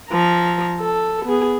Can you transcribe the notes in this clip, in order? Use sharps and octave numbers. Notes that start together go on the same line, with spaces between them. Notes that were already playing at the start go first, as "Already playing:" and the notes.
F3 A#5
A4
B3 G#4